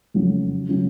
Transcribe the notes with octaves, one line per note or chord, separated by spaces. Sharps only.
F2 C#3 F#3
C#3 F#3